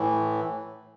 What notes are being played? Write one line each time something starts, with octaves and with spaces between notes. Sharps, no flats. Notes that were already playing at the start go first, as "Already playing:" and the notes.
Already playing: A2 E3